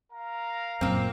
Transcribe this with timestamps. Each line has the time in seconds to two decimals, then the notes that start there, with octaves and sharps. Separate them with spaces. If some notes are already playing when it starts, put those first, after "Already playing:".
0.11 A#4 F5 A#5
0.81 F#2 A#2 A#3 C4